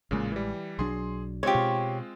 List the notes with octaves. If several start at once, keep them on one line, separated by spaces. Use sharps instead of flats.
A1 A#2 C#3 G#3
E3 G3
B1 F#3 D4 G#4 C6
G#3 C4 F4 G4 C#5
B2